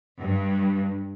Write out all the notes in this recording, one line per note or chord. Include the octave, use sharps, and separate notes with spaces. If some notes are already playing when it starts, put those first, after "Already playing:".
G2